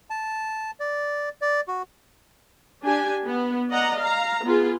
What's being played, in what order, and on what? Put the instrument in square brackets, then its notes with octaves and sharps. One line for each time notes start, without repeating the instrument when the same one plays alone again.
[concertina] A5
D5
D5
F#4
[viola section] D4 G4 G#5
B3
D5 D#5 F#5 A#5
F5 A#5
B3 F4 G#4